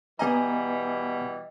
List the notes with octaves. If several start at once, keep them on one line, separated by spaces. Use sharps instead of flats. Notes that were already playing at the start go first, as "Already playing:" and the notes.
B2 E3 G3 B3 D#5 G#5 A#5